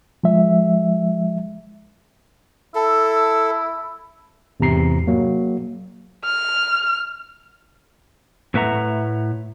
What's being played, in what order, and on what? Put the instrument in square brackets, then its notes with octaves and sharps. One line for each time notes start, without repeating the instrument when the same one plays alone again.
[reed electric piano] F3 G#3 E5
[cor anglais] E4 [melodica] A4
[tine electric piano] E2 G#2 C3 A#5 C7
F#3 A#3
[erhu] F6
[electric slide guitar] A2 A3 B4 E5 F#5 A#5